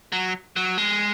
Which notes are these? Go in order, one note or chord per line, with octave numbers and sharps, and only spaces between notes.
F#3
F#3
G#3